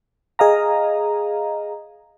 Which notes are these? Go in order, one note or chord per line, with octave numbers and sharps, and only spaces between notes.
G#4 D#5 F5 A#5